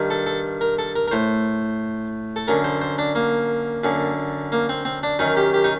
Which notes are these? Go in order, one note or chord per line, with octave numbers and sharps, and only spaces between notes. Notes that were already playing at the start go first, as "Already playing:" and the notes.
Already playing: G2 D#3
A4
A4
A#4
A4
A#4
A#4
A2 C5
A4
F#2 D3 A#4
C5
C5
D4
A#3
F#2 D3
A#3
C4
C4
D4
F#2 D#3 D#4
G4
G4
D#4